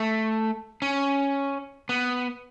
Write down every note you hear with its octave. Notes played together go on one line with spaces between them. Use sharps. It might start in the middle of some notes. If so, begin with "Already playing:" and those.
Already playing: A3
C#4
B3